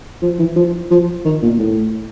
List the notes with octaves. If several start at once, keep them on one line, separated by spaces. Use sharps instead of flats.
F3
E3
F3
F3
D#3
A#2
A2